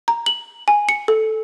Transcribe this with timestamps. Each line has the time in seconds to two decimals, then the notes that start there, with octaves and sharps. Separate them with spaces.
0.08 A#5
0.26 F#7
0.68 G#5
0.89 C#7
1.08 A4